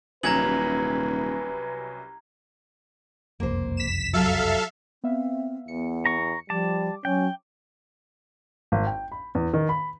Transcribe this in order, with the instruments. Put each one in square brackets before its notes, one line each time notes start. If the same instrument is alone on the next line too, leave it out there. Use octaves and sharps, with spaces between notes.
[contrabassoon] D#1 [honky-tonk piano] C2 F#3 C#4 [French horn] B4 [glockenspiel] A#5 G#6 F#7
[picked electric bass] F#1 C2 F2 [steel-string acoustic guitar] A#3 C5
[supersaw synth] B6 E7
[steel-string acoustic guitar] F#3 G3 [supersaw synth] A4 E5 F5
[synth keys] B3 E5 F5 [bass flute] C4
[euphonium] E2 [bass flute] B3 [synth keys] C#7
[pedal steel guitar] A#5 C#6
[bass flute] F3 [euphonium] G3 [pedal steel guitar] A5 [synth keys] D6
[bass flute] F#3 [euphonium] C#4 [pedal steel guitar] G5
[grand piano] G#1
G5
B5
E2
D#3
B5